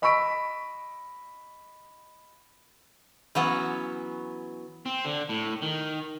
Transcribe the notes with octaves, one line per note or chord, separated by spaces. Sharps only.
D#5 B5 C#6 E6 B6 D7
E3 F#3 B3 C#4
C4
D3
A2
D#3